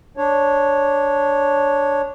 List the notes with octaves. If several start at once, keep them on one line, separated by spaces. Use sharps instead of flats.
D4 C#5